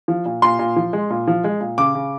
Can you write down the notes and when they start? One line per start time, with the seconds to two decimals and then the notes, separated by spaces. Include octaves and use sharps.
0.08 F3
0.26 A#2
0.42 A#2 C6
0.59 A#2
0.76 F3
0.93 G#3
1.10 A#2
1.27 F3
1.44 G#3
1.61 A#2
1.78 C#3 D6
1.95 C#3